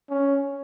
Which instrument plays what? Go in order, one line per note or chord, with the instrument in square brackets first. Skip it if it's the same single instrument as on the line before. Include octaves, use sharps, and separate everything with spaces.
[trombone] C#4